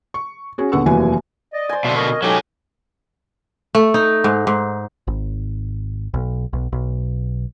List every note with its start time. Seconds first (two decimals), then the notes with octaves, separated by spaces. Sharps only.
0.14 C#6
0.58 C#4 F#4 G#4
0.72 D#1 D3 B3 F#5 C#6 E6
0.86 F1 D#2 E3 F#3 F#4 G#5
1.53 D5 D#5
1.69 C5 G#5
1.85 B2 D3 E5 F5 C6
1.96 A#4 D#5 C#6
2.22 F#3 G#3 C#4 D#4 G4 A4 G#5
3.75 A3
3.94 D#4
4.24 G#2
4.47 G#2
5.07 G#1
6.14 B1
6.53 B1
6.73 B1